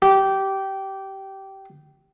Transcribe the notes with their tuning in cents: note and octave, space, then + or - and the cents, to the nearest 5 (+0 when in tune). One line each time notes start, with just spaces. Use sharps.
G4 -15